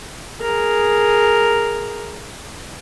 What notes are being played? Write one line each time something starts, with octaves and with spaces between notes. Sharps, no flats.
G#4 A#4